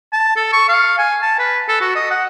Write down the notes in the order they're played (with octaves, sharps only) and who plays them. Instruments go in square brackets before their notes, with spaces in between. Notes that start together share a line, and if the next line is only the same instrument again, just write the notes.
[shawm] A5
A4
C#6
F5
G#5
A5
B4
A4
F#4
D#5
F#5